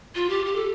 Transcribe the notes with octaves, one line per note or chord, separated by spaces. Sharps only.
F4
G4
G4
A4